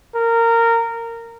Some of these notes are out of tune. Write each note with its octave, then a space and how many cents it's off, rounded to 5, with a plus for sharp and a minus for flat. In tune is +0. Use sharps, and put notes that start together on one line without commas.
A#4 -15